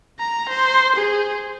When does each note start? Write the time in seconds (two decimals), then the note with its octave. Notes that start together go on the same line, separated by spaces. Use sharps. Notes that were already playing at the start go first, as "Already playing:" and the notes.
0.20 A#5
0.49 C5
0.96 G#4